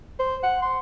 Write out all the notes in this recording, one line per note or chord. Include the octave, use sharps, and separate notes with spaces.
C5
F#5
C6